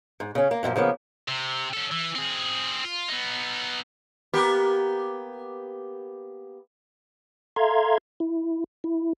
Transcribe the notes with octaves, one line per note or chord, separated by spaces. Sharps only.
G#2
C#3 C#4
A#3
F#2 A#2 D3 F3
C#3 F3 A#3 B3
C3
C#4 A4
E3
C4 G#4
F4
B3 D#4
A#3 B3 G4
A4 E5 F5 A#5 C6 G#6
E4
E4